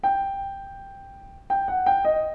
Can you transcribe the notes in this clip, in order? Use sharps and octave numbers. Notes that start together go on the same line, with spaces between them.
G5
G5
F#5
G5
D#5